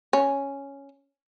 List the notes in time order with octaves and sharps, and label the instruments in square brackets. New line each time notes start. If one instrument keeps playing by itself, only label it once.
[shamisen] C#4